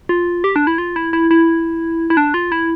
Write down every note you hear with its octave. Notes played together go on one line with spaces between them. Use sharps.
F4
G4
D4
E4
F4
E4
E4
E4
E4
D4
F4
E4